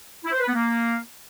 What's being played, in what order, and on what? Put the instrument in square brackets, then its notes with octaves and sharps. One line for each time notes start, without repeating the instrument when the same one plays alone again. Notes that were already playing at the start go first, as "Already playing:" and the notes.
[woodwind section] E4
C5
B4
B3
A#3